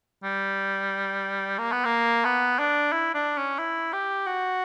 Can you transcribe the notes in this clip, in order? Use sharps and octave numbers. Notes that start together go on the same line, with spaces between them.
G3
A#3
B3
A#3
B3
D4
E4
D4
C#4
E4
G4
F#4